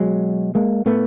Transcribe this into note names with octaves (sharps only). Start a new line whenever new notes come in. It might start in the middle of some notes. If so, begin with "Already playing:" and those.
Already playing: B2 F#3 G#3
G#3 A#3
A2 A3 B3